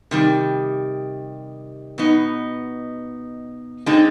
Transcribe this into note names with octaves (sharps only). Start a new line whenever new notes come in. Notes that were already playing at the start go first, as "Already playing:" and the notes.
C3 D#3 G3
B2 B3 D#4
D3 G#3 C4 D#4